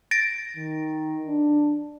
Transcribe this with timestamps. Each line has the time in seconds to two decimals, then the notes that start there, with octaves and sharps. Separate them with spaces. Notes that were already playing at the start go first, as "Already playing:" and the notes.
0.11 A6 A#6 D7
0.57 D#3
1.27 D4